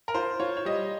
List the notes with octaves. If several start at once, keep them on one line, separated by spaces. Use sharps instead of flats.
A#4
F4 C5
F4 C#5
C#5
G3 D#5